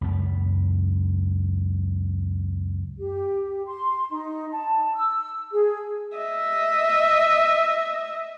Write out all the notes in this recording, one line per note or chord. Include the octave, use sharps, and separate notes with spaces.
C#2 F#2 B3
G4
C6
D#4
A5
E6
G#4
D#5 E5